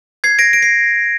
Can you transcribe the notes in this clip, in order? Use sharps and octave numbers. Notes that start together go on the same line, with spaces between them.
G#6 C7
A#6 D7
D7
C7